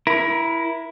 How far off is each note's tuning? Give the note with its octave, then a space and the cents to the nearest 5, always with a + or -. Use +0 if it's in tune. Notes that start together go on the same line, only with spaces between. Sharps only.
E4 +5 A#4 +35